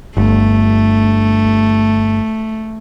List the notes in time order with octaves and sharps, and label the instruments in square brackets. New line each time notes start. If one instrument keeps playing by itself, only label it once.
[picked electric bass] G1 [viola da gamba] A3